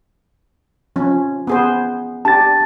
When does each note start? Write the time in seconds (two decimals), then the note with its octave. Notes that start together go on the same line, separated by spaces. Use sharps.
0.96 F3 C#4
1.47 B3 G#4 C5
2.25 D4 G4 A5 A6